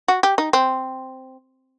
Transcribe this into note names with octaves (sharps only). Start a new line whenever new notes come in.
F#4
G4
D#4
C4